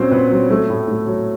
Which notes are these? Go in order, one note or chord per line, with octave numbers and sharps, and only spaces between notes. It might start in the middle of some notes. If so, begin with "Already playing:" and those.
Already playing: A#2 F#3 C4 C#4 C5 C#5
A#2 B3 B4
F#3
F#3 A3 A4
A2
A2
F#3